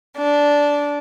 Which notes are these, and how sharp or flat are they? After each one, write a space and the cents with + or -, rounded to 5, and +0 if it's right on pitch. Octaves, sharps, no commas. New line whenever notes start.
D4 -10